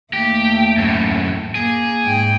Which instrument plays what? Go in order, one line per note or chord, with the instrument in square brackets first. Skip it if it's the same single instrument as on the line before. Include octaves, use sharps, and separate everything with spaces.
[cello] D#2 A3 [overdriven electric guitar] G4
[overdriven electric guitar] F#2 A2
[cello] A#3 [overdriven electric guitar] G#4
[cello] G#2 G5